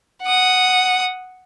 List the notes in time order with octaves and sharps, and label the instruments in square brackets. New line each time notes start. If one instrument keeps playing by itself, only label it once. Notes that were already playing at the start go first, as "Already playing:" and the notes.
[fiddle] F#5 D#6